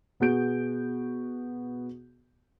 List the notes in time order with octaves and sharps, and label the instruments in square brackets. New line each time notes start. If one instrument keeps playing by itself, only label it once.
[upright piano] B2 B3 F#4 G#4 G6 D7